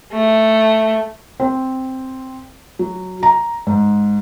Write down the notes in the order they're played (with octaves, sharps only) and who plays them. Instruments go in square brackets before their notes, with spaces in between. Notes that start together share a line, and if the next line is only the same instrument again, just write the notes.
[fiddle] A3
[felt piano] C4
F#3
A#5
G#2